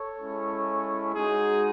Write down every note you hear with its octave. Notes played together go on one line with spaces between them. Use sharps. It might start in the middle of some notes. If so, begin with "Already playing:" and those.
Already playing: A4 C#5
G#3 C#4 E4
G#3 D#4 F#4 G#4